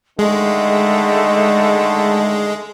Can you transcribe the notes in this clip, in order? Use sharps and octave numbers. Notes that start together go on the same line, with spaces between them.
D3 D#3 G#3 A3 D#5